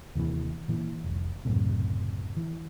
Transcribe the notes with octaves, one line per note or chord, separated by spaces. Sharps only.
D#2 C3 D#3 E3
A#2 E3
F1 C2
C#2 F#2 A2 C3
E3